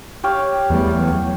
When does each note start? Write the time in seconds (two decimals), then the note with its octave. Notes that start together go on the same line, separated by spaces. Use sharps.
0.24 G4 C#5 F5
0.70 E2 G3 A3
1.00 F#3